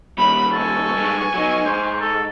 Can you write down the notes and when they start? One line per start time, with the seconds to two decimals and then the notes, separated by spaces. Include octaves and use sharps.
0.18 D#2 G3 B5
0.52 A4 G#5 C#6
0.96 G2 G#3
1.34 F#3 D#4
1.65 G#2 C5
2.01 A4